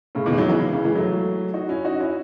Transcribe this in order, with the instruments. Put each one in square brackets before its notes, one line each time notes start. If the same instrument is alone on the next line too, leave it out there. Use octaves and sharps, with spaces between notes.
[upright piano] A2 C#3
B2 D#3
G#3
D#3 F#3
C#3 E3
C#3 E3
E3 G#3
F#3 A3
D#4 F#4
C#4 E4
D#4 F#4
C#4 E4